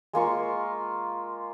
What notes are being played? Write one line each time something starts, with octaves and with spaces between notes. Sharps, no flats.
G#3 A#3 F4 C#6